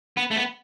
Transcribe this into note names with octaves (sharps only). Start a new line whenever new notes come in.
B3
A3
B3